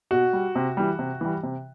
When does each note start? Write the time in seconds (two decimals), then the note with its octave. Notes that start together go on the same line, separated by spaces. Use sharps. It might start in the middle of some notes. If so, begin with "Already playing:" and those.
0.11 B2 F#4
0.33 G3
0.55 C3
0.77 E3 G3
0.99 C3
1.21 E3 G3
1.43 C3